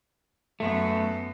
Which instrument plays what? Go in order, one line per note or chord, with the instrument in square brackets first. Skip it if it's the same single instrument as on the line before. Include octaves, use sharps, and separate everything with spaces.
[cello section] F#2 B3 [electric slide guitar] A3